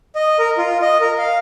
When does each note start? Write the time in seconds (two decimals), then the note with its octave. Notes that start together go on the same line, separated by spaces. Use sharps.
0.15 D#5
0.39 A#4
0.58 F4
0.82 D#5
1.01 A#4
1.18 F5